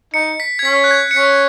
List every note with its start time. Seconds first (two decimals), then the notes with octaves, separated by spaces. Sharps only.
0.14 D#4 C#7
0.40 B6
0.59 G#6
0.65 C#4 B6
0.84 F#6
0.91 G#6
1.11 C#7
1.16 C#4 B6